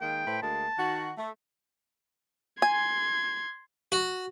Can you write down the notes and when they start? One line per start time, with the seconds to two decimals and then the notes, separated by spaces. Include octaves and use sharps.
0.01 D#3 G#3 A#3 G5
0.26 A2 B4 C5
0.42 D2 G#3 A#3 A5
0.78 D#3 F#4
1.18 A3
2.62 G#5 C6 G#6
3.92 F#4